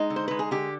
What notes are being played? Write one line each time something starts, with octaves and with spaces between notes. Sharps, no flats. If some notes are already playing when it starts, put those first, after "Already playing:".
Already playing: G#3 D#4
D3
C5
G#3 B4
G#4
D3 G4